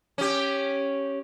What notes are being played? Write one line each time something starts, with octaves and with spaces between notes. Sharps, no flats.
C#4 G4